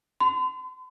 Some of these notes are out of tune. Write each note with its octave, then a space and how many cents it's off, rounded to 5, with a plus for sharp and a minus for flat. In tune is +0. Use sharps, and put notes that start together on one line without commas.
C6 -40